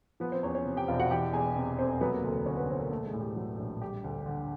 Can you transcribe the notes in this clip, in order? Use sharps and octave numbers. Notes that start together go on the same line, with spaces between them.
F3 B3 B4
C4 C5
E2 C#4 C#5
C#4 C#5
C3
G4 G5
E1 F4 F5
F#4 F#5
E3 G4 G5
E2 G#4 G#5
C3
F1 C4 C5
F#3 B3 B4
A#3 A#4
D2
D3 C#4 C#5
B3 B4
E1 C4 C5
A#3 A#4
A3 A4
G#3 G#4
A2
G4
F#3
A#1
G3 G4
D2
D3